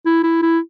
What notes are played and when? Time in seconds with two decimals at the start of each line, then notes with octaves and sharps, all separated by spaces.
0.05 E4
0.23 E4
0.42 E4